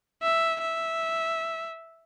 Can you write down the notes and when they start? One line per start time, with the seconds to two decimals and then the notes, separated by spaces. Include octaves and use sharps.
0.23 E5
0.62 E5